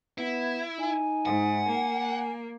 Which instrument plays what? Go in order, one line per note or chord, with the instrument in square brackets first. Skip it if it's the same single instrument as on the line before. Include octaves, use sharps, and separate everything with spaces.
[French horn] B3 [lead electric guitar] E4
[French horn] D#4 [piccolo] G#5
[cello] G#2 [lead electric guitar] F#5
[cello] A#3